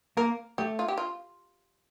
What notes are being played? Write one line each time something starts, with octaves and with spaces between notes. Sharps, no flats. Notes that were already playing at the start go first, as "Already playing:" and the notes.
A#3 A#4
A3 G4
F4
G4
F4